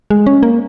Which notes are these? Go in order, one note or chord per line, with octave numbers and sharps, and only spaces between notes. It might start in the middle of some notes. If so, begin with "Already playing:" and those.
G#3
C#4
A#3